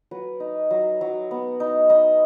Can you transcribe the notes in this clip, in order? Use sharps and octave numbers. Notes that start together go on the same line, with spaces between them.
F#3 B4
D#4
F#3
F#3
B3
D#4
D#4 D#5